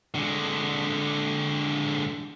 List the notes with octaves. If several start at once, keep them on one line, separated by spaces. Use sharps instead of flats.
D3 G#3